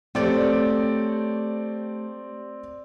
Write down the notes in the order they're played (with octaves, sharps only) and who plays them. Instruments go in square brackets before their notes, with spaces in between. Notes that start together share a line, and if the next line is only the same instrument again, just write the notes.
[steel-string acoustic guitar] A3 G4 C#5 [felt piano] C4 D5